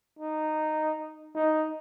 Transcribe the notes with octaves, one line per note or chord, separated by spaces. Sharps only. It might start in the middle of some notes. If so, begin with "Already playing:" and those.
D#4
D#4